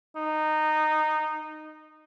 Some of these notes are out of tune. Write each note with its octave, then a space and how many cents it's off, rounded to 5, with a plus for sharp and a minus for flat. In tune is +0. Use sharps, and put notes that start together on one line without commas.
D#4 -15